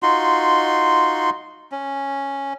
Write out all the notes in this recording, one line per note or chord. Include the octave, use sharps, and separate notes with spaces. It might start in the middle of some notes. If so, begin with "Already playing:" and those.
D#4 F4 F#4 C6
C#4